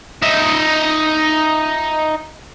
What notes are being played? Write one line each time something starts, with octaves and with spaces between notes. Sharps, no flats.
D#4 E5